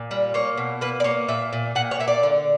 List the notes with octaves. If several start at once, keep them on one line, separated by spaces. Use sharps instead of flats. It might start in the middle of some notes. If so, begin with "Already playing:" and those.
Already playing: A#2
G3
A#3 C#5
B2
A#3 B4
D5
A#3 C#5
A#2 E5
A#2
A#2 F#5
C#5
A#3 E5
D5
D3